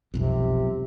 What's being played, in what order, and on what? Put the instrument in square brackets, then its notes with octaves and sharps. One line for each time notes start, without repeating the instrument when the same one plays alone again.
[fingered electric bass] E1 B1 F2 [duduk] C3